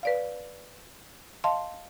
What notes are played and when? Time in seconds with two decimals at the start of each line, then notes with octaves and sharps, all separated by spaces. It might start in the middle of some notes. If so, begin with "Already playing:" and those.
0.03 B4 D5 F5
1.44 D#5 F5 A5 C6